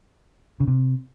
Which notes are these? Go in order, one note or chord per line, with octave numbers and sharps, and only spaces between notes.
C#3
C3